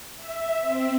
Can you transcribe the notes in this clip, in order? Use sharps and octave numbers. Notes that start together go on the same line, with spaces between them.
E5
C4